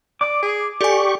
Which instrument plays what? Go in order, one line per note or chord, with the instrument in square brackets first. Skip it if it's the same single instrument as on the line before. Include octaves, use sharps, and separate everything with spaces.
[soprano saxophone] D5 [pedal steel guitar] D6
[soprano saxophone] G#4
[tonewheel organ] G4 C#6 [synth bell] A4 G#5 [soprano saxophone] D5